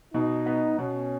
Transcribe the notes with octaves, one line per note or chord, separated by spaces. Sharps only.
B2 D#4
B3
B2 C#4